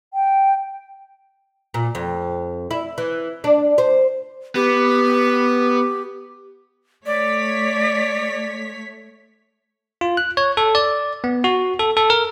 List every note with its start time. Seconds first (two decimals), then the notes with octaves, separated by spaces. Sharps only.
0.14 G5
1.74 A#2
1.95 F2
2.71 E4
2.98 E3
3.44 D4
3.78 C5
4.55 B3 G4
7.06 A3 C#5 D5 B6
10.01 F4
10.17 F#6
10.37 C#5
10.57 A4
10.75 D5
11.24 B3
11.44 F#4
11.79 A4
11.97 A4
12.10 A#4